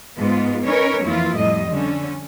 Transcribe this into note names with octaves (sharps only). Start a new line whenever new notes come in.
G#2 B3 F4
C#4 D#4 A#4 B4 C#5
F2 E3 A#3 E4 F4
F2 A2 G3 D#5
D3 C#4